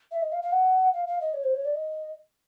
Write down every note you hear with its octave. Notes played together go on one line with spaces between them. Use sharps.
E5
D#5
F5
F5
F#5
F5
F5
D#5
C#5
C5
C#5
D5
D#5